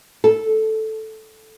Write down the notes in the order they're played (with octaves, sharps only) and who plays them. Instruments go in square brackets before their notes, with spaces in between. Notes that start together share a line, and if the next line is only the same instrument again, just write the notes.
[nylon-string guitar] A4